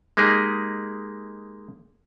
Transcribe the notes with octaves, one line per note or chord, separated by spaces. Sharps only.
G#3 A#3 D#4 G4 G#4